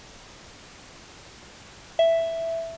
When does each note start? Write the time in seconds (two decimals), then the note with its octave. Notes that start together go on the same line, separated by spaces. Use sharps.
1.99 E5